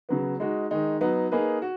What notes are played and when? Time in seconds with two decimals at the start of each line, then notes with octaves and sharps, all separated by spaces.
0.09 C#3 F#3 B3
0.40 G#3 D#4 F#4
0.71 D#3 G#3 D#4
1.01 F#3 B3 D#4
1.32 A#3 D#4 G#4 B4
1.62 F#4